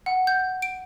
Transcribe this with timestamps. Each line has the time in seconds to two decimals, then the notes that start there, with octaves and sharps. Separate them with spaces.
0.06 F#5
0.27 G6
0.62 D7